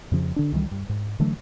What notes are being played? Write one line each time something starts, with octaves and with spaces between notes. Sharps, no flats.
F2 C#3 F3
D3 D4
C#2 D#3 E3 G3
G2
G#2
D3 E3 F#3 A3